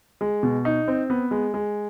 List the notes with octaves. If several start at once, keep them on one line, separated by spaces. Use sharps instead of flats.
G#3
B2
D#4
C4
B3
G#3
G#3